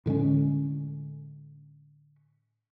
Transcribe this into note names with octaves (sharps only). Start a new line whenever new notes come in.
A2 D3 G#3 C#4